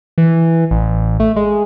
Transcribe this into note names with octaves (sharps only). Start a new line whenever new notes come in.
E3
A1
A3
G#3